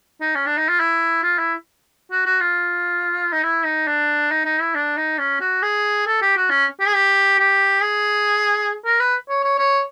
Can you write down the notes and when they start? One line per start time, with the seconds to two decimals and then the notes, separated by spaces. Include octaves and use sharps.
0.21 D#4
0.35 C#4
0.46 D4
0.57 D#4
0.68 F4
0.79 E4
1.23 F4
1.38 E4
2.11 F#4
2.26 F#4
2.40 F4
3.32 D#4
3.43 E4
3.64 D#4
3.87 D4
4.31 D#4
4.45 D#4
4.60 E4
4.75 D4
4.97 D#4
5.19 C#4
5.40 F#4
5.62 G#4
6.07 A4
6.21 G4
6.36 F#4
6.50 C#4
6.80 G4
6.87 G#4
6.94 G4
7.39 G4
7.82 G#4
8.85 A#4
8.99 B4
9.29 C#5
9.43 C#5
9.58 C#5